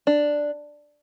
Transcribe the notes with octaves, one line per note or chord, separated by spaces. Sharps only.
D4